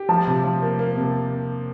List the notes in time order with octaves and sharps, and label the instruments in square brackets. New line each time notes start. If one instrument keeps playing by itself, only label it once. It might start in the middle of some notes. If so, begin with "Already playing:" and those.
Already playing: [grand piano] G4
[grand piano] F3 [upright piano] A5
[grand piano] C3
F3
A#3
A#3
C3